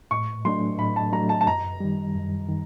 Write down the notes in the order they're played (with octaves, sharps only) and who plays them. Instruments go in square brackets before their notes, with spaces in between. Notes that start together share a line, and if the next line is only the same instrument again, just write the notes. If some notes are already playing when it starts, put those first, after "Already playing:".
[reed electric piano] A2 [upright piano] C#6
[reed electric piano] F#3 A3 D4 [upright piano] C6
[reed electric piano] A2 [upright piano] B5
[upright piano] A5
[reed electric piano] F#3 A3 D4 [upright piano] A#5
[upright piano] A5
A5
[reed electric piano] F#2 [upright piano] A#5
[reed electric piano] D#3 G3
F#2
D#3